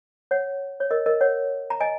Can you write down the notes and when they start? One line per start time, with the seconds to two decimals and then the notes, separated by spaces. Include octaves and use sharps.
0.31 C#5 F#5
0.80 C#5
0.91 A#4 D#5
1.06 A#4 D#5
1.21 C#5 F#5
1.70 A#5
1.81 D#5 G#5